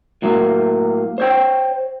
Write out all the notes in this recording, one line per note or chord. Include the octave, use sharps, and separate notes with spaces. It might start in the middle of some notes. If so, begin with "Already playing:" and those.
A2 F#3 A#3
C5 C#5 G5